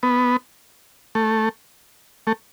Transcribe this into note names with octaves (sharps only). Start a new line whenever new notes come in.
B3
A3
A3